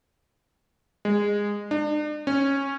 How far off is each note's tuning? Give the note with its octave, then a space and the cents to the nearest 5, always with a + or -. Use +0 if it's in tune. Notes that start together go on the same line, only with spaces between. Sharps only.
G#3 -15
D4 +40
C#4 -10